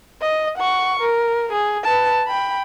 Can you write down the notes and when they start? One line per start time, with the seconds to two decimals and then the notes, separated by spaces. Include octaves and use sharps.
0.22 D#5
0.58 F#5 C#6
1.00 A#4
1.52 G#4
1.84 B4 A5
2.27 G5 B5